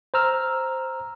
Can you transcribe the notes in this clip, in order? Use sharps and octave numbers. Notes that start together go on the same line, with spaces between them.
C5 A#5 E6 F6